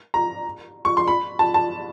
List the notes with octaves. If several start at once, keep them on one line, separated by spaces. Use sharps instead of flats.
A#5
C#6
C6
B5
A5
A5